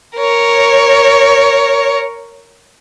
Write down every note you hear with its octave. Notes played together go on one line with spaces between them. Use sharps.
A#4 C#5